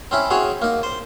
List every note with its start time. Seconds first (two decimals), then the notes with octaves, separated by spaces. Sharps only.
0.11 C4 C#4 E4
0.30 C4 F#4 G#4 C#5
0.62 A#3 D#4
0.83 C5